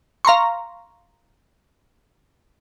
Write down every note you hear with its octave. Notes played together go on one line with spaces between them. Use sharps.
F5 A#5 C6 C#6